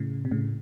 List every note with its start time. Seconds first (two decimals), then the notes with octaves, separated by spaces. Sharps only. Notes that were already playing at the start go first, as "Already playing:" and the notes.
Already playing: A2 C#3
0.25 C3
0.31 A2 C#3